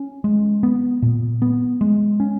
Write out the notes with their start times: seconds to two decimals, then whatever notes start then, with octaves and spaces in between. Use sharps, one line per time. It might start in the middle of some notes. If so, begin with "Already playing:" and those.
Already playing: C#4
0.24 G#3
0.63 B3
1.02 A#2
1.42 B3
1.81 G#3
2.20 C#4